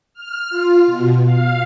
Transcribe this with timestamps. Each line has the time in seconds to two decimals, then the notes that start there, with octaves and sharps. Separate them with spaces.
0.14 F6
0.50 F4
0.87 B2
1.23 F5